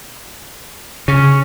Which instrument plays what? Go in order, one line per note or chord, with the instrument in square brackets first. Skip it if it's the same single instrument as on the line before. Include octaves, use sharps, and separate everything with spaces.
[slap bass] C#3 [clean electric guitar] C#4